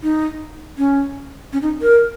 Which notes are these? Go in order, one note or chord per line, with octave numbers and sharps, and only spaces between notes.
D#4
C#4
C#4
D#4
A#4